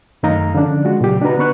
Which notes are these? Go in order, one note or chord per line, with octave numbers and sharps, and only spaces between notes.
F#2 D#3 A3 D#4 F5 A#5
D3 F3 C#4 D4
G#3 F4 F#4
A#2 C#3 F#3 G4
D4 D#4 F#4 B4 A#5
D3 B3 B4 C#6 F#6